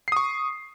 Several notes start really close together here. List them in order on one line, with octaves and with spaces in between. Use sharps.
C7 D#6 C#6